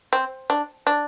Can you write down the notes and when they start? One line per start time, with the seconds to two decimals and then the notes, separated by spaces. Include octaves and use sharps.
0.13 C4
0.50 D4
0.87 D4